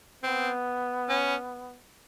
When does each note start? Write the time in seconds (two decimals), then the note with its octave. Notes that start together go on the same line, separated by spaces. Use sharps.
0.23 B3 C4
1.09 C#4